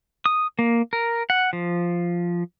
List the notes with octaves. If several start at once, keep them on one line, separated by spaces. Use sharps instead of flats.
D#6
A#3
A#4
F#5
F3